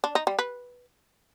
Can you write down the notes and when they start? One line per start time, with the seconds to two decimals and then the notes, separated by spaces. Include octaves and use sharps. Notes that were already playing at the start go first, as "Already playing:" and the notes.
0.04 D4
0.15 D#4
0.27 G3
0.39 B4